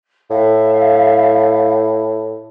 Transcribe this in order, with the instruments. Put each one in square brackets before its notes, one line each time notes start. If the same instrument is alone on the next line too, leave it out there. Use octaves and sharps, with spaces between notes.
[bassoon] A2 [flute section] E5 F5